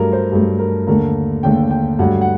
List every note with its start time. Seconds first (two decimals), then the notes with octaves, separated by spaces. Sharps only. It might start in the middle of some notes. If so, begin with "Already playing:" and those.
Already playing: G2 F#3 A3 A#4
0.13 C5
0.32 G2 F#3 A3
0.59 A#4
0.87 D#2 D3 A3 A#4
1.43 D#2 D3 A3 G5
1.71 G5
1.99 G2 F#3 A3 F#5
2.21 F#5